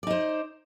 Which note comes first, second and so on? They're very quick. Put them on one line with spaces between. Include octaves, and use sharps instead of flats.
D5 D#4 C5